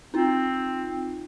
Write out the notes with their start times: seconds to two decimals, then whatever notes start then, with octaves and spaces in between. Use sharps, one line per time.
0.14 C4 D#4 F4